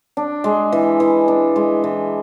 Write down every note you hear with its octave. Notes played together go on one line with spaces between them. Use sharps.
D4
G#3
E3
E3
D4
G#3
E3